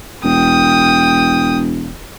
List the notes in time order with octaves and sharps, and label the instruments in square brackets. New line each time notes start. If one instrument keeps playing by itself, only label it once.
[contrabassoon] E1 [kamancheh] G5 D#6